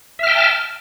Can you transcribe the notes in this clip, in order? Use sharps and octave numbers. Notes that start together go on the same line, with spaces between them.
E5 G5 A5 F6